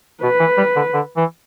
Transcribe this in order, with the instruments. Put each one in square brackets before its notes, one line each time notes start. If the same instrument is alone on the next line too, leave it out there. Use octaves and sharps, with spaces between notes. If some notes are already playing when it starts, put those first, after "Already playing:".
[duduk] B2 [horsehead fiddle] B4
[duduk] E3
G3
D3
D3
E3